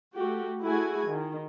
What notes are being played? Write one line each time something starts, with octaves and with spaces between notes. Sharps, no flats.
A3 F#4 G4
A3 E4 F#4 G#4 G#5
D#3